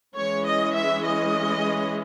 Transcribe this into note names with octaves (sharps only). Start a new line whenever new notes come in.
E3 G#3 C#4 C#5
D#5
E5
D#5